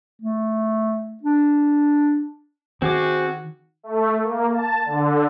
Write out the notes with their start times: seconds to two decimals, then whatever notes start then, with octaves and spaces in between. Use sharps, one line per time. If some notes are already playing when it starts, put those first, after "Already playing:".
0.22 A3
1.23 D4
2.82 D#3 C4 F#4 G#4 D6
3.83 A3
4.23 A#3
4.54 A5
4.86 D3